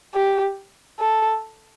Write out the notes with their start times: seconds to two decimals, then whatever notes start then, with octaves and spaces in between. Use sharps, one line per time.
0.14 G4
1.00 A4